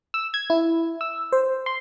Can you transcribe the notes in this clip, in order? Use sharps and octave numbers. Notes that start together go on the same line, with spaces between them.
E6
G#6
E4
E6
C5
C6